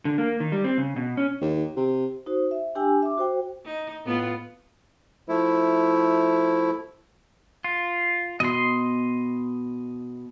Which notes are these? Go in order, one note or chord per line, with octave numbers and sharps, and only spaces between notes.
D3
A#3
D#3
G3
C4
C#3
B2
C#4
D#2
C3
D#4 F#4 C5
E5
D4 G4 G5 G#5 E6
E5 D6
F#4 C5 G5
D#4
A2 B3 F4
F3 A3 E4
F4
B2 D#5 C6